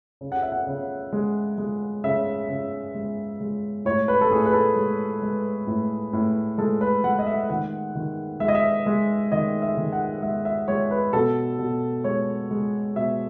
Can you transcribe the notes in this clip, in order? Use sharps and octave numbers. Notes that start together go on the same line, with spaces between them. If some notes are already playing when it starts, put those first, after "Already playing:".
C#3
F#5
E5
F#5
C#3
G#3
G#3
C#3 E5
C#3
G#3
G#3
A2 C#5
B4
A4
A2 G#4
B4
A4
G#3
G#3
A2
A2
G#3 A4
B4
G#3 F#5
D#5
E5
D#3 F#5
D#3
G#3 E5
D#5
E5
G#3
D#3 D#5
E5
D#3
F#5
G#3 E5
E5
G#3 C#5
B4
B2 A4
B2
G#3 C#5
G#3
B2 E5